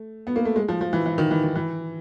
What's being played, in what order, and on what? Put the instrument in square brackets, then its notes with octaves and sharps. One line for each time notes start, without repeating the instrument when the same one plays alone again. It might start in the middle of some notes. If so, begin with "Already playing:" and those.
Already playing: [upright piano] A3
B3
A#3
A3
G#3
F3
F3
E3
E3
D#3
E3
D#3
E3